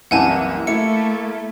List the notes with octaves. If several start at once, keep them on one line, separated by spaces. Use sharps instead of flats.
C2 F#2 E3 A#3 F#5 G#5 A5
A3 E4 C#7